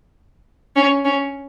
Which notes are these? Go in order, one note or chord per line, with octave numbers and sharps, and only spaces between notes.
C#4
C#4